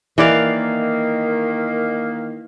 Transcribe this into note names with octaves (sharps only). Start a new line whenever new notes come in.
D#3 E3 A#3 D5 F5